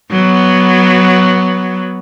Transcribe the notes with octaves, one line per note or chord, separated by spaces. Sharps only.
F#3 B3